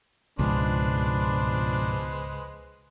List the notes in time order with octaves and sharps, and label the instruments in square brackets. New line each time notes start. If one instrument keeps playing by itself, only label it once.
[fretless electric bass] C#2 [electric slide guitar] G#2 B2 F3 [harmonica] G#3 B4 C5 [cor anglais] D4